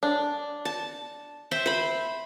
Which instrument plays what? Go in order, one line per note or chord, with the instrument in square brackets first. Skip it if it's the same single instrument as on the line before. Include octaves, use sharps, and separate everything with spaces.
[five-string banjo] D4
[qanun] A5
C5 E5 G5
C5 B5